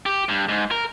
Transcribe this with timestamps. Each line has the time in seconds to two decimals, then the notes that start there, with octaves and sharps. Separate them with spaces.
0.06 G4
0.29 G2
0.49 G#2
0.71 A#4